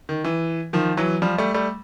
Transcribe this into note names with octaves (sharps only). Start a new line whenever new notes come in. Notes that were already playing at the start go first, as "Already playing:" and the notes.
D#3
E3
D#3 F3
E3 F#3
F3 G3
G3 A3
G3 A3